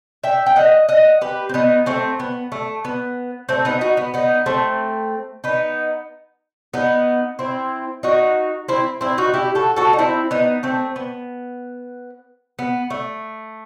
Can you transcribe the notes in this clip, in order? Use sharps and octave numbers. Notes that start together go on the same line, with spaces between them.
E5 G5
G5
D#5 F#5
D#5 F#5
G4 B4
C4
B3 D#4
A3 C4
B3
A3
B3
A3 C4
B3 D#4
D#4 F#4
B3
B3 D#4
A3 C4
B3 D#4
B3 D#4
C4 E4
D#4 F#4
C4 E4
C4 E4
D#4 F#4
E4 G4
F#4 A4
F#4 A4
D#4
C4 E4
B3 D#4
A3 C4
B3
B3
A3